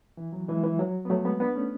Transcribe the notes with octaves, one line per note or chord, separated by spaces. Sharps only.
E3
F#3
E3 G#3
E3
F#3
B3
F#3 A3
G#3 B3
B3 D4
A3 C#4